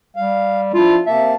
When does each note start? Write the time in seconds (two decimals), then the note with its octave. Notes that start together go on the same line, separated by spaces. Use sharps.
0.16 G3 F5
0.74 F3 D4 E4 F4
1.06 C3 A#3 E5 A5